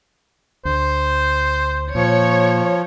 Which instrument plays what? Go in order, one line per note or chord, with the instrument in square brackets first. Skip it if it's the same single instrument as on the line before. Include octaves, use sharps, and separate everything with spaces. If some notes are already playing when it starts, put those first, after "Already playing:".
[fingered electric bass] D2 [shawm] C5
[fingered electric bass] A#2 [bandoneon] F3 [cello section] C#5